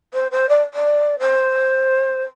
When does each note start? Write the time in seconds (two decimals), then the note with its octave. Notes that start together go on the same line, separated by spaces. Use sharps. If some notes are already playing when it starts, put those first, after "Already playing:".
0.14 C5
0.31 C5
0.49 D5
0.74 D5
1.19 C5